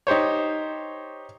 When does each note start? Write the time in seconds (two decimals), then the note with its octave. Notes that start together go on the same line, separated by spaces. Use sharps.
0.07 D#4 G4 C5 C#5